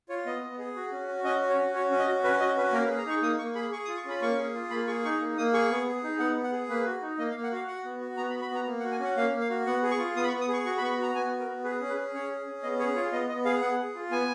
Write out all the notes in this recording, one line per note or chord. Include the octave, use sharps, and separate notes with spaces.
F4 C#5
B3 D#5
B3
G#4
F#4
C#4
F#4
C#4 D#5
F#4
C#5
C#4
F#4 C#5
C#4
D#5
F#4
C#4 B4
F#4 D#5
C#4 B4
A#3 A#4
B4
G#4
A#5
D#4 C#6
A#3 D#6
A#3 C#6
G#4 B5
G#4 C#6
D#6
F4
C#6
C#4 B5
A#3 C#6
G#4
F4
A#3 B5
G#4 C#6
D#4 C#6
A#3
A#3 D#6
G#4 C#6
B3
G#4
D#4
B3 F#5
B3
F#5
G#4
A#3 B4
F#4
D#4
A#3 D#5
F5
A#3
F#5
F#4 F5
F#4 F#5
B3
F#4
B3 A#5
B5
F#4
B5
B3 A#5
A#3
F#5
F#4
G#5
C#4 F#5
A#3 F5
A#3
F5
F#4
B3 F#5
G#4
C#6
F4
B3 D#6
B5
C#6
B3
D#6
G#4 C#6
F#4 C#6
B5
B3 C#6
B5
F#4 A#5
B3 G#5
F#4
A#4
B3
G#4 B4
C#4
B4
G#4
C#4 C#5
G#4
C#4
B3 D#5
G#4 C#5
F4 C#5
B3 D#5
B3 D#5
G#4 F5
B3 F#5
G#4
F4
B3 G#5